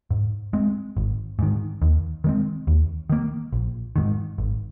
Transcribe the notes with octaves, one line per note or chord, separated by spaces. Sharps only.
G#2
G#3 C4
G#1
G#2 D#3
D#2
D#3 G#3 C4
D#2
D#3 A#3
A#1
G#2 D#3
G#1